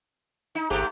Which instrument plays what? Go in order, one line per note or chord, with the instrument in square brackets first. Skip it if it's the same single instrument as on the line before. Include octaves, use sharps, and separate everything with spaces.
[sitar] D#4
[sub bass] G#1 [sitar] G#2 A3 G4